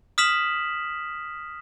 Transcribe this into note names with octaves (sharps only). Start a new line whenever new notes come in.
D#6 F6 B6 E7 F#7